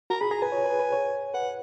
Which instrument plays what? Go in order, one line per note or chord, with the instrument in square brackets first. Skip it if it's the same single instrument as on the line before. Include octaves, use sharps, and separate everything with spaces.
[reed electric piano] F#4 [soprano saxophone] A#5
[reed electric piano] G#4 [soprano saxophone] B5
[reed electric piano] G#4 [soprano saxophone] A#5
[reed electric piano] B4 [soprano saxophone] G#5
[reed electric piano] C#5
B4
B4
C#5
[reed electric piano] B4 [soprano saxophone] F#5